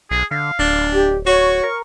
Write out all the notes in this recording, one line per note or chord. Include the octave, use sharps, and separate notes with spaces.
B1 G#4
D3 F5
D1 D4
G4
F#4 C#5 C#6
A#4